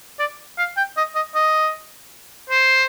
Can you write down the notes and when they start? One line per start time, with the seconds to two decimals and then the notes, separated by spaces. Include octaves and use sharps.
0.19 D5
0.58 F5
0.77 G5
0.97 D#5
1.15 D#5
1.35 D#5
2.50 C5